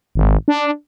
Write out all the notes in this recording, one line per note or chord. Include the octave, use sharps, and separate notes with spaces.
G#1
D4